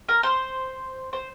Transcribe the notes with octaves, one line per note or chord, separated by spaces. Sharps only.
A#4
C5
C5